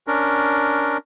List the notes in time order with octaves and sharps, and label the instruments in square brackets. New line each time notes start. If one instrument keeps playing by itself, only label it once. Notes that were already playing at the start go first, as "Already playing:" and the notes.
[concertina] C#4 D4 A#4